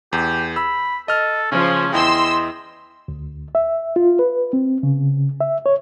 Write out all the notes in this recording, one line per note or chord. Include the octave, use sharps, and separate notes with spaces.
E2 G4
B5 E6
A4 D#5 F6
C#3 F3 C#4
E2 E4 D#5 G5 C6 E6
D2
E5
F4
B4
C4
C#3
E5
C#5